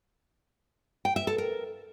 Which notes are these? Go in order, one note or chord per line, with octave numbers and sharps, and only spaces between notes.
G5
E5
A4
A#4